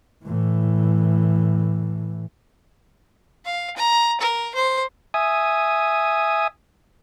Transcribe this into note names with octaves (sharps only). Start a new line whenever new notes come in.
A2 E3
F5
A#5
A#4
C5
E5 G#5 D#6